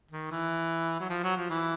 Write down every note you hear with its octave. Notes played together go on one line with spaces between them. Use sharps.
D#3
E3
F#3
F3
F#3
F3
E3